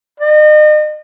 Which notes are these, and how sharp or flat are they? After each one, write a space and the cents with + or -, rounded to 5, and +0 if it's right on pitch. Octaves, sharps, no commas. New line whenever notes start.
D#5 -40